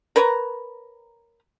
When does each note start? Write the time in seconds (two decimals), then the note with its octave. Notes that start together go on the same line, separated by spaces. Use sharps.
0.16 A#4 B4 C#5 A#5